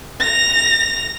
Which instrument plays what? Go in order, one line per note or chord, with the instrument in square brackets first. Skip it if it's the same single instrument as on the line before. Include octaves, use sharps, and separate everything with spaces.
[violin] A#6 F7